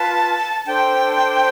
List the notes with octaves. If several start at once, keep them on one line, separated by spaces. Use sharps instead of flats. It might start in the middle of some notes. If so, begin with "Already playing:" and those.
Already playing: F4 B4 A5
D4 A4 C5 G5